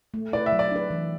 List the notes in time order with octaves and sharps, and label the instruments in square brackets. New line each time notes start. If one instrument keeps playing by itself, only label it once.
[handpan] A3
[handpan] E4 B4 [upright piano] D5
[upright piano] E5
[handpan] F#3
[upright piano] D5
[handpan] D4 B4
E3